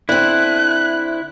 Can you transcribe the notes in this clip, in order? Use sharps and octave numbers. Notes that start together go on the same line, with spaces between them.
D3 C4 E4 F#6